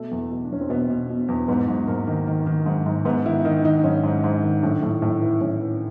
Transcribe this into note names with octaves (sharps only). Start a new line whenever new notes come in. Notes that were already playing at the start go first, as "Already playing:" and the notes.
Already playing: B2 A3
E2
B2
D4
E2 C#4
C4
B2 B3
B2
B2
E2
G#2 B3
G#2
G#2 A#3
D#3
D#3
D#3
G#2
G#2
G#2 B3
D#3 E4
D#3 D#4
D#3 D#4
G#2 C#4
G#2
G#2
D#3
A2 D4
A2
A2
E3
A2 C#4
E3